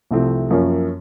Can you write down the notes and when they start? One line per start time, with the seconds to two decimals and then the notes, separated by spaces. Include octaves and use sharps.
0.11 C2 C3 F3 A3 C4
0.50 F#2 F3 A#3 C#4